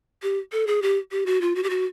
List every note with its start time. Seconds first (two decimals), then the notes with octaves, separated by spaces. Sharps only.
0.23 G4
0.52 A4
0.67 G#4
0.82 G4
1.12 G4
1.26 F#4
1.41 F4
1.55 F#4
1.63 G4
1.70 F#4